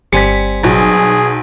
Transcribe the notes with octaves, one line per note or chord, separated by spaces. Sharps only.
G1 G3 C4 G#5 B6 C#7
B1 F#3 G#4